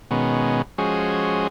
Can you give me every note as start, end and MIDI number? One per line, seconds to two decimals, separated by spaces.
0.11 0.62 47
0.11 0.62 51
0.11 0.62 56
0.11 0.62 59
0.11 0.62 61
0.78 1.47 53
0.78 1.47 56
0.78 1.47 61
0.78 1.47 66
0.78 1.47 68
0.78 1.47 72